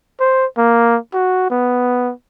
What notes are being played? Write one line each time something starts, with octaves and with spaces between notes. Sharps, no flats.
C5
A#3
F#4
B3